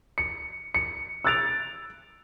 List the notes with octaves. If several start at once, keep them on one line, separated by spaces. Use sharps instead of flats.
C#7
C#7
E6 F#6 G#6 A6 D7 F7